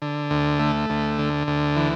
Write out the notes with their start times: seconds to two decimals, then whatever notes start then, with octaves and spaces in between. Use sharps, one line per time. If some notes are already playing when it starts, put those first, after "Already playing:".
0.02 D3
0.30 D2
0.59 A3
0.90 D2
1.19 D3
1.47 D2
1.76 E3